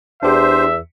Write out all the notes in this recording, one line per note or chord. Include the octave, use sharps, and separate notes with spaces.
E2 D4 G4 C5 E5